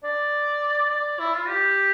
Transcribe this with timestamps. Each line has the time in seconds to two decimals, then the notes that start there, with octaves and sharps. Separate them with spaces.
0.04 D5
0.90 D5
1.19 E4
1.35 F4
1.49 G4